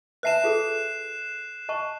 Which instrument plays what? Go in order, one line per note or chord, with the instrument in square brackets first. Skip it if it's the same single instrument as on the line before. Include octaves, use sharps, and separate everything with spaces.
[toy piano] B4 E5 A5 [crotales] F#6 C7 E7
[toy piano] F4 G#4 A4
D#5 A5 C#6